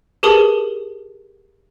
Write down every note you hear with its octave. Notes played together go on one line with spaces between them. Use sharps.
G4 G#4 A#4 B4 A5 D#6